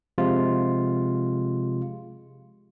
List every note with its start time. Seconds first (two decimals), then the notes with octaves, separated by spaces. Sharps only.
0.18 C3 F3 G#3 F4